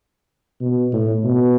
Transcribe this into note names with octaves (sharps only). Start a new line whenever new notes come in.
B2
A2
B2